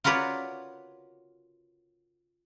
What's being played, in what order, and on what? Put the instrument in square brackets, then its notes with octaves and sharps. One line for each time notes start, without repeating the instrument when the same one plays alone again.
[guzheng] F4 F#4 A#4 B4 C#5 D5